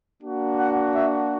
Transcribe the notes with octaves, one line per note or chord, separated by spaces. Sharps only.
A#3 D4 F#4
F#5
E5